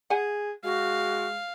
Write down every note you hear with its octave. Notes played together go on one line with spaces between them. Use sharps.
G#4 F#5 G#5
G#3 F#4 F5